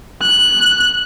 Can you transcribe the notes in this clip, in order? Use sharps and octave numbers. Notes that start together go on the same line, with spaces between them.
F#6